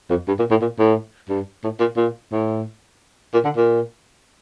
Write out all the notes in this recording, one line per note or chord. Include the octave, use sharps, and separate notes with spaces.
F2
G2
A#2
A2
A#2
A2
G2
A2
A#2
A#2
A2
A#2
D3
A#2